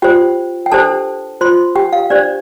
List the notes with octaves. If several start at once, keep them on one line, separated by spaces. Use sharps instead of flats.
F4 G4 C5 G5
G5
D4 G4 A4 C5 A5
F4 C5 C6
G4 G5
F5
D4 G4 C5 D5